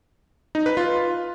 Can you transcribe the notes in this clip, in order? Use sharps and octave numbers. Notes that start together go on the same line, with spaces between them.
D#4
B4
F4